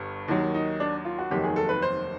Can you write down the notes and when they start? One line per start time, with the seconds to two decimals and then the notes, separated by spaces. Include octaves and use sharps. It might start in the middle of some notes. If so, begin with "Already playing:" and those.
Already playing: G1 G2
0.28 D#2 D#3 F#3
0.54 D#4
0.80 D4
1.05 F4
1.19 F#4
1.30 F1 D#2 D#3 F#3 G4
1.44 G#4
1.56 A4
1.69 B4
1.82 C5